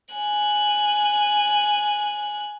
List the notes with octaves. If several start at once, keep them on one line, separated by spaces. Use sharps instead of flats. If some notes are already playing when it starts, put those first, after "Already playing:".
G#5 F#6